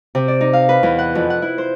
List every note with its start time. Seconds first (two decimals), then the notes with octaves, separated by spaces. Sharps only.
0.15 C3
0.28 D5
0.41 D#4
0.53 F5
0.69 B4
0.83 E2
0.99 F#5
1.15 F2
1.30 F#5
1.42 E4
1.58 C5